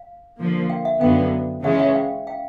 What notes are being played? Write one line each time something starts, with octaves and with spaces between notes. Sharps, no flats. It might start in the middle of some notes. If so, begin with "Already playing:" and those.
Already playing: F5
D3 F3 A#3
F5 G5
E5 F#5
F#2 D3 F#3 B3 F5 G5
C#3 E3 G#3 C#4 E5 F#5
E5 F#5
F5 G5
F5 G5